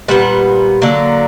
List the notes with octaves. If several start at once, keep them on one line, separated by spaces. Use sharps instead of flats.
A#2 G3 B3 F#5
D3 F#3 A#3